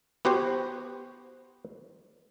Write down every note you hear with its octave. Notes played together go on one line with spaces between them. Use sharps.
B3 F#4 G4 C5